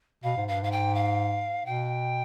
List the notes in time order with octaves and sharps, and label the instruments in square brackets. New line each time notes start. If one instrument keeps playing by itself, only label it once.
[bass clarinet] B2 [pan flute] F5
[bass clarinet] G#2
[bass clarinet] G2 [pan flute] F5
[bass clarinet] G#2 [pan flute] F5
[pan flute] G5
F5
[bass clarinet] B2 [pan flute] G5